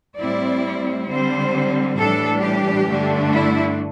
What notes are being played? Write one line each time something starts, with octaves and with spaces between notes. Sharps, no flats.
A2 G3 C4 E4 D5
D3 G3 C4 C5
A2 E3 G3 D4 A4
G4
G2 D3 A3 D4
E4